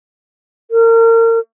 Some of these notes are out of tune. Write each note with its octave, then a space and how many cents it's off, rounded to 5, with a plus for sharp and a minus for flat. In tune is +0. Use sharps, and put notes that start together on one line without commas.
A#4 -35